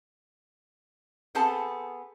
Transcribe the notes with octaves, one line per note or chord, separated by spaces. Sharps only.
B3 C4 G#4 A4 A5